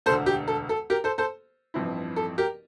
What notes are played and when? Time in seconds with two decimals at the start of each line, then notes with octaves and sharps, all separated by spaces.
0.06 E1 D2 D3 A4 C5
0.26 G4
0.48 A4
0.69 A4
0.90 G4 A#4
1.04 A4 C5
1.18 A4 C5
1.74 A1 G2 F3 C4 E4
2.16 A4
2.38 G4 A#4